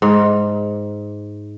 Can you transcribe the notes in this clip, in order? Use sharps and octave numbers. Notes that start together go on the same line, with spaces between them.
G#2